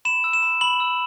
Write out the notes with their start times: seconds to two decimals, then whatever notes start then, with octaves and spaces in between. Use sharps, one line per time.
0.05 B5 E7
0.24 E6
0.33 E7
0.43 B5
0.61 B5 F#7
0.80 E6